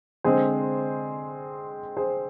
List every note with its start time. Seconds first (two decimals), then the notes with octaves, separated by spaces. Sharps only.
0.24 D3 G#3 C4 G#4 C5
1.97 G#4 C5